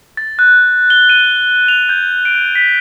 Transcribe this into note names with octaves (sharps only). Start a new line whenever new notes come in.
A6
F#6
G7
D#7
F7
G6
D7
B6